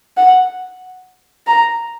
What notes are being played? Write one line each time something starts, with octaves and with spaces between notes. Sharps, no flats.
F#5
A#5